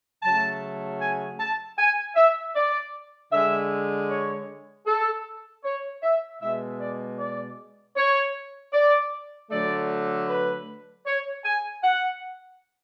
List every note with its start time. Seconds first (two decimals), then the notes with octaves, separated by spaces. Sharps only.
0.22 C#3 F#3 A3 A5
1.00 G#5
1.39 A5
1.77 G#5
2.16 E5
2.55 D5
3.32 D3 G#3 E5
4.09 C#5
4.86 A4
5.64 C#5
6.03 E5
6.41 B2 G#3 E5
6.80 D5
7.19 D5
7.96 C#5
8.73 D5
9.50 D3 F#3 A3 D5
10.28 B4
11.06 C#5
11.44 G#5
11.82 F#5